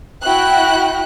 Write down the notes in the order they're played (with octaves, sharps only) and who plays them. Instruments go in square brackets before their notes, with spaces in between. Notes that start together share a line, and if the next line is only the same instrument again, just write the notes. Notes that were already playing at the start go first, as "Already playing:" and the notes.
[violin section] E4 F#4 G5 F#6